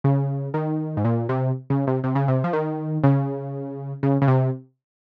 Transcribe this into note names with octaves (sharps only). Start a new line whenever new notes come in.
C#3
D#3
G#2
A#2
C3
C#3
C3
C3
C#3
C3
F3
D#3
C#3
C#3
C#3
C3